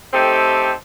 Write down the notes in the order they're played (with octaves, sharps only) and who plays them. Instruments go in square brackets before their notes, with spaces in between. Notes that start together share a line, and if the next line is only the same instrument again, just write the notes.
[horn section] A3 C4 D#4 G4 A4